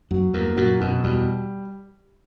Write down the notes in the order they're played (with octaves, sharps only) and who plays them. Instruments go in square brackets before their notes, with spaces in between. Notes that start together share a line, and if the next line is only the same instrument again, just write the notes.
[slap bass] F#2 [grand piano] F#3
[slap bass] E2 G2 [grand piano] A#3
[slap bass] F#2 A#2 [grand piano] F#3
[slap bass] F#2 [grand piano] B2
[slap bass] E2 [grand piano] G3